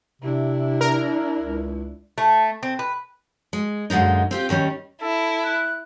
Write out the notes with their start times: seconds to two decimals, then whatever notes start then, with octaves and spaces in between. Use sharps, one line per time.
0.22 C3 D4 E4
0.81 A#4
1.39 C#2
2.18 A3
2.63 C4
2.79 B4
3.53 G#3
3.90 F#2 A#2 D3 G#3 D#4
4.31 C4 F4 G4
4.49 D#2 D#3 G3 C#4
5.02 E4 A4
5.44 F#6